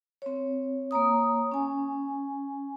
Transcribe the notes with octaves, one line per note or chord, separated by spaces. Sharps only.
C4 C#5
A#3 C#5 A#5 D#6
C#4 G#5